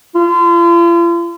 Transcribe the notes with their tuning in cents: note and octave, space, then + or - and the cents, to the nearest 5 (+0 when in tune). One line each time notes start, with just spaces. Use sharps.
F4 -40